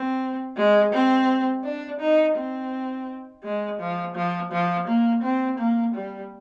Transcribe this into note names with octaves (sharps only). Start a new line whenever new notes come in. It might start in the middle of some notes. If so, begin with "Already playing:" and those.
Already playing: C4
G#3
C4
D4
D#4
C4
G#3
F3
F3
F3
A#3
C4
A#3
G3